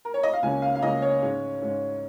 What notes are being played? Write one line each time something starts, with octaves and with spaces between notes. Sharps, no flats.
A#4
C#5
D#5
F5
C#2 C#3 A#3 C#4 G#5
F5
F5
C#2 C#3 A#3 C#4 D#5
C#5
G#2 G#3 C#4
G#2 G#3 C#4